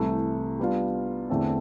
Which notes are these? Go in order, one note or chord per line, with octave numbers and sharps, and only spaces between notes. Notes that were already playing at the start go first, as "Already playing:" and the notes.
Already playing: C2 C3 E3 A3 E4
G3 B3 D4 F4
E2 D3 A3 C4